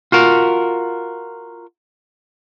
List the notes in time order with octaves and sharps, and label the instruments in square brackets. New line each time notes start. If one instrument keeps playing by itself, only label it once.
[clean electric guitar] F4 F#4 A#4